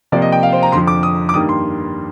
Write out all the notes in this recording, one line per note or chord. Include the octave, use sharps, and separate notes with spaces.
C3 F3 A#3 D5
D#5
G5
F5
C5
A#5
F2 D3 F3 C6
D6
D#6
D6
G2 D#3 G3 A#3 D#6
C6